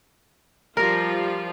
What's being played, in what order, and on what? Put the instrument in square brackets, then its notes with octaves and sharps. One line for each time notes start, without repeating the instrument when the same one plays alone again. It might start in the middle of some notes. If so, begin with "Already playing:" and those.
[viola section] F3 G3 F4 [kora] A#4